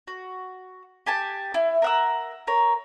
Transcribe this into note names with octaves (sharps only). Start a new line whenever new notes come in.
F#4
G4 G#5 A5
E4
A#4 F#5 E6
A#4 C#5